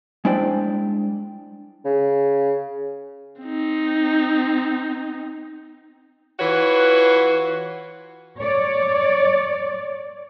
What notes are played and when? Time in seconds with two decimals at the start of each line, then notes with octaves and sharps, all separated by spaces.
0.25 G#3 D4 E4 C5 D5 G5
1.85 C#3
3.42 C4 D#4
6.40 E3 F4 F#4 B4 C#5
8.39 C#5 D5